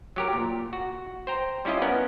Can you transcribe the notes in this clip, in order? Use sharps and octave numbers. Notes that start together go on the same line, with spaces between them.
F#3 G4 A#4
A#2
F#4
C5 G5 A#5
G3 C#4 E4 F4 D#5
B3 C#4 A#4 F#5